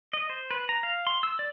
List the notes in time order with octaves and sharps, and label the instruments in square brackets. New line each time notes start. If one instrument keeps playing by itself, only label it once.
[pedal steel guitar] D#5
C5
B4
A#5
F5
C6
E6
D5